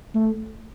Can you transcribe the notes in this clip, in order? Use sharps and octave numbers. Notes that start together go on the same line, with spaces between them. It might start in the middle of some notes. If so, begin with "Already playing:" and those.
A3